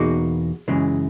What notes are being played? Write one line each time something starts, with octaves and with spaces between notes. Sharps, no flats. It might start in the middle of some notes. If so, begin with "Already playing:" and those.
Already playing: E2 B2 A#3 D#4 F#4 G#4
F#2 C#3 E3 G#3